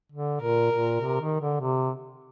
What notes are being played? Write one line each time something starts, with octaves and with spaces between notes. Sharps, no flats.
D3
A#2 A#4
A#2
C3
D#3
D3
C3